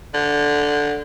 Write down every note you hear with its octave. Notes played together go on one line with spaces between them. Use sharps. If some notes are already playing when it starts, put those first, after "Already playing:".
D3